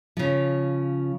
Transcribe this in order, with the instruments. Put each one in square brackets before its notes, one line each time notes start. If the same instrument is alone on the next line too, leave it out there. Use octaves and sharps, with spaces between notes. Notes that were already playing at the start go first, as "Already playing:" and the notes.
[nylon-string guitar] C#3 F3